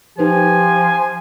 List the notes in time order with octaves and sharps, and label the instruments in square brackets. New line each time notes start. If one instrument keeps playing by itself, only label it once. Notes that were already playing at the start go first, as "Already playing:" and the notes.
[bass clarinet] F3 [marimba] D#4 B4 C5 [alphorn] G4 [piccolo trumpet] G#5